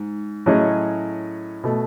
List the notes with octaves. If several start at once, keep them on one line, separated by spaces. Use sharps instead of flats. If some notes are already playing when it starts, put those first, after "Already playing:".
Already playing: G#2
A2 F#3 C#4 G#4 D#5
B2 A3